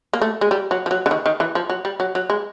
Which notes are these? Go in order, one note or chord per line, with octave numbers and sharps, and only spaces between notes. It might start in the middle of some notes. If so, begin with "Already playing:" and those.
A#3
A3
G#3
G3
F#3
F3
F#3
D3
D#3
D#3
E3
F3
F#3
G3
F#3
F#3
G#3